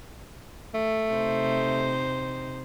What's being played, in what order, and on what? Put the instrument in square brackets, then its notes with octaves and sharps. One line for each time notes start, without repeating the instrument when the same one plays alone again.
[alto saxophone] A3
[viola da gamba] C3 D#4 C5